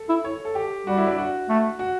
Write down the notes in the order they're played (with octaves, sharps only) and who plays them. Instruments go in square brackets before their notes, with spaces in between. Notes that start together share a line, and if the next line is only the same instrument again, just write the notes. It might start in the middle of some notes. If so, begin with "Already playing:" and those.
Already playing: [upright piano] A4
[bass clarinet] E4
[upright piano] C#5
A4
G4
[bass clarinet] G3 [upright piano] F#4
[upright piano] E4
D4
F#4
[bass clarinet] A3
[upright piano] F#4